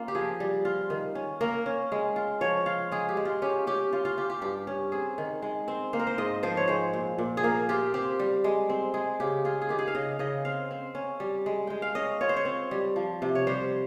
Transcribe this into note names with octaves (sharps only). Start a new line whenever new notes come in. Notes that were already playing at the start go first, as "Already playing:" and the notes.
Already playing: A#3 C#4 F4
G4
F3 G#4
G3
F4
D#3
C#4
A#3 A#4
C#4
G#3
F4
F3 C#5
F4 F5
G#3 G#4
G4
G#3
F4
C#4 G4
C#4 G4
C#4 F4
F4
F4 G4
G4
G2 G4
C#4
C4 G#4
D#3
G#3
C4
A#3 C5
A#4
C5
G#2 D#5
F3 C5
C#5
G#3 C5
A#2
A#2
G#4
A#3 A#4
F4 G4
C4 G4
G3
G#3
C4
G#3 G#4
C#3 G4
F4 G#4
G#4
D#3 G4
G#4
F5
C#3 D#5
C#3 D#5
C4 F5
C4
C#4
G3
G#3
G#3 G5
F5
C#4 D#5
F4 C#5
C5
C#5
C4
G3
F3
C3
C#5
G3 C5